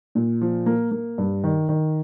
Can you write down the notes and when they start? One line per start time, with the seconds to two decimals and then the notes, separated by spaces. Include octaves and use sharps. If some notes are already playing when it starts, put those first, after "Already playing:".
0.15 A#2
0.41 F3
0.66 A#3
0.91 A#3
1.18 G2
1.44 D#3
1.69 D#3